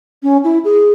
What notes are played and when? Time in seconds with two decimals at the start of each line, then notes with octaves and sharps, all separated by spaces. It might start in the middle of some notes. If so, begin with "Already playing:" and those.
0.23 C#4
0.44 E4
0.64 G#4